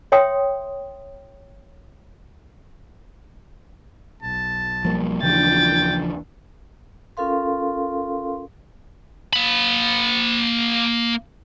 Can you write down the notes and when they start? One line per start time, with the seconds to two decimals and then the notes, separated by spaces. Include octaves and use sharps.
0.12 C#5 E5 G5 C6 D#6
4.23 B1 A5
4.85 F3 G3 A#3
5.22 D#2 C#3 E3 F3 D4 G5 A6
7.17 C#4 F4 A4 A#4 F5 C6
9.33 A#3 B5